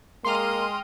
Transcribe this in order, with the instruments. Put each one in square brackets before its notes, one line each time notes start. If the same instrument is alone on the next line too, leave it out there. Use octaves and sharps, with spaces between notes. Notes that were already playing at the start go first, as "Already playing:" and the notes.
[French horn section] G#3 [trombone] A#3 [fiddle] D#5 G5 [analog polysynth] C6 F6